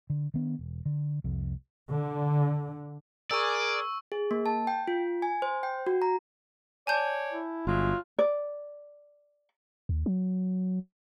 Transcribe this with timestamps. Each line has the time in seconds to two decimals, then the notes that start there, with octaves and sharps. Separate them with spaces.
0.10 D3
0.34 D#3 B3 D4
0.59 E1
0.86 D3
1.24 C2 F2
1.92 D3
3.31 G#4 A#4 D5 G#5 C#6 E6
4.12 G#4
4.31 A#3
4.46 A5
4.67 G5
4.88 F4
5.22 G#5
5.42 C5
5.63 G5
5.87 F#4
6.02 A#5
6.87 C#5 D5 G#5 A5 G6
7.32 E4
7.67 G1 F#3 G#3 E4 F4
8.19 D5
9.89 D#2
10.06 F#3